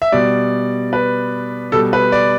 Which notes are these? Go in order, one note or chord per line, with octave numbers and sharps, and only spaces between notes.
E5
B2 G3 D5
B4
B2 G3 A4
B4
D5